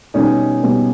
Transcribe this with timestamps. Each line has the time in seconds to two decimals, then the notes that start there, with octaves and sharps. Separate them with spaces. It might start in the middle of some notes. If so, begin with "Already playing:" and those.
0.14 B2 G3 B3 C#4 D#4
0.63 B2 G3 B3